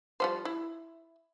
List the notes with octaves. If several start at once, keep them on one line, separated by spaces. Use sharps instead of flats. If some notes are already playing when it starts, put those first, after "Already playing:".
F3 G3 C5
E4